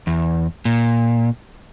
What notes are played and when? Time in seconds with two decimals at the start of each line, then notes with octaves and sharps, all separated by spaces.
0.07 E2
0.65 A#2